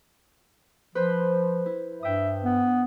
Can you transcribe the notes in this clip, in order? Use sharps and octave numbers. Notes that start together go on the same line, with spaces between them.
F3 B4 C5 B5
E4
G2 E5 G5 D#6
B3